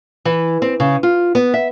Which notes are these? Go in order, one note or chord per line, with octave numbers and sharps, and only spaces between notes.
E3
C4
C#3
F4
B3
E5